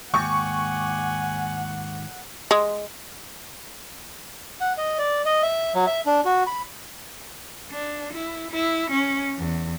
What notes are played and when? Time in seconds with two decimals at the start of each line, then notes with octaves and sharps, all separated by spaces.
0.14 D#2 G#2 G4 F#5 G#5 C#6
2.51 G#3
4.61 F#5
4.77 D#5
4.98 D5
5.25 D#5
5.43 E5
5.74 F#3
5.87 E5
6.06 D4
6.25 F#4
6.47 B5
7.72 D4
8.13 E4
8.51 E4
8.91 C#4
9.38 E2